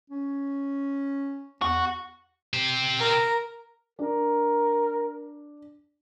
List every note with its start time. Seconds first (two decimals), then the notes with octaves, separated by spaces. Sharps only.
0.10 C#4
1.62 E2 F#4
2.54 G4 C5
2.99 A#4
3.99 D4 A#4